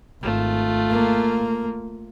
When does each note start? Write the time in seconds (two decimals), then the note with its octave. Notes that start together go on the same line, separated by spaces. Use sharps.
0.22 G#1 A3 F4
0.90 A#3